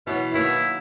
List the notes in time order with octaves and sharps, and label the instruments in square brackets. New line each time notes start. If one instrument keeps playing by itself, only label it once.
[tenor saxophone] B2 [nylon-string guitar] E3 F#3
[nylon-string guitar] D#3 F#3 A#3 [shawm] E4